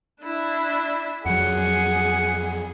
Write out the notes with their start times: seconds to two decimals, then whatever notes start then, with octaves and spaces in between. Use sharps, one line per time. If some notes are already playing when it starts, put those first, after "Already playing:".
0.21 D4 E4
1.26 F2 F#3 G#4 F#5